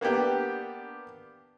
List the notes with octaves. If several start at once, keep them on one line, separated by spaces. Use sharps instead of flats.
A#3 B3 D4 G4